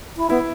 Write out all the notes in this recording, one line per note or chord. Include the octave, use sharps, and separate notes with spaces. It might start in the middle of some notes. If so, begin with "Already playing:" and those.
E4
B3 E4